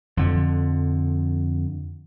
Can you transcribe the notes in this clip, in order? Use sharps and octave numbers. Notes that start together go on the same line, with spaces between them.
F2 D3 F3